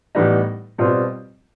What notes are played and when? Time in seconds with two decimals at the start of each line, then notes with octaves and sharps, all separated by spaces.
0.15 A2 E3 G3 B3 D#4
0.78 B2 G3 C4 F4